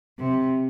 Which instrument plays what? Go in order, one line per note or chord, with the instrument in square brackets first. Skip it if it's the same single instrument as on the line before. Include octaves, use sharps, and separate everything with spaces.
[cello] C3